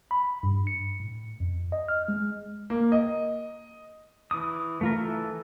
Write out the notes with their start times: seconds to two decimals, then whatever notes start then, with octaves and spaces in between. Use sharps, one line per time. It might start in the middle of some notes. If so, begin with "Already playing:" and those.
0.11 B5
0.43 G2
0.67 C#7
1.00 A2
1.40 F2
1.72 D#5
1.89 F6
2.08 G#3
2.70 A#3
2.92 D#5
4.31 E3 D6 D#6
4.81 A3 F4 A#4
4.98 E3 A4